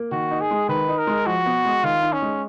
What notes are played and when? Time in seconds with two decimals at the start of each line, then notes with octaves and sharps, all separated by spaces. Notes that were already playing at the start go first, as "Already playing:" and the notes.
Already playing: A#3
0.12 D#3 F#4
0.31 D#4
0.41 G#4
0.51 G#3
0.69 D#3 B4
0.89 D#4
0.98 A#4
1.07 G#3
1.26 F3 F#4
1.46 B3
1.65 G#3
1.83 D#3 F4
2.03 D#4
2.13 C#4
2.22 G#3